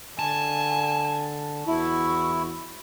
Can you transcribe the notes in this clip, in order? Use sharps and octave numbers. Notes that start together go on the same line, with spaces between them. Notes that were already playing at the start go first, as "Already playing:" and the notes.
D3 G#5 A5
E2 E4 F#4